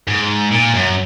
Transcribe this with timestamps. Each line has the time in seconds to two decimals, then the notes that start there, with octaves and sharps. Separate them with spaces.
0.08 G#2
0.52 A#2
0.75 F#2